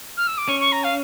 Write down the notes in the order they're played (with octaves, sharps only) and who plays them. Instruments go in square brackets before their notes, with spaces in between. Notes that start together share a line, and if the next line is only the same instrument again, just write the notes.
[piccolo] F6
E6
D6
[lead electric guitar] C#4 [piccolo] C#6
[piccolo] C#6
A#5
F5